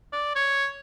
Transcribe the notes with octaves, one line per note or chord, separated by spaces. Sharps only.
D5
C#5